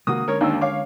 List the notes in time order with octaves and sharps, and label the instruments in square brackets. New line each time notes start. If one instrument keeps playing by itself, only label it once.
[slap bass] C3 D#3 G#3 [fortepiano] A#3 F#4 [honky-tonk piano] D#6
[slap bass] D3 G#3 C#4 [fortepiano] A#4 C#5
[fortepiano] D#2 E6 [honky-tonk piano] D4 D#4 F5
[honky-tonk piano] C#5 F5 [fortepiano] D6